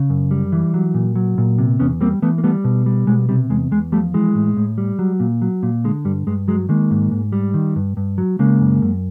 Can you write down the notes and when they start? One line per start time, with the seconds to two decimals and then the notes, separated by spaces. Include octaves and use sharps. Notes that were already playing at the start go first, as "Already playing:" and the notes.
Already playing: C#3
0.10 F#2
0.31 G3
0.52 E3
0.74 F#3
0.94 A#2
1.16 F#3
1.38 A#2
1.58 C3
1.80 E2 B3 C#4
2.01 G3 A#3 C4
2.22 E3 A3 B3
2.38 A#3
2.44 G3 A3 B3
2.64 B2
2.86 G3
3.07 B2 G#3
3.29 C3 G3
3.50 E2 G#3
3.71 E2 G#3
3.92 F3 G3 A3
4.14 E3 G#3
4.35 A2
4.57 A2
4.78 G3
4.99 F#3
5.20 A#2
5.42 F#3
5.63 A#2
5.84 D3 G#3
6.05 G2 G3
6.27 G2 G#3
6.48 F#3 G#3
6.69 D#3 G#3 A#3
6.91 G#2
7.12 G#2
7.32 G3
7.54 D#3
7.76 G2
7.97 G2
8.18 F#3
8.39 C#3 G#3 A#3
8.60 F#2
8.82 F#2